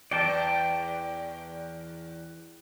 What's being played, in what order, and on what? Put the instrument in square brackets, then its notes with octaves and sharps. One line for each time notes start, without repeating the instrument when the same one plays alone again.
[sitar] E2 [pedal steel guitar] D5 G5 A5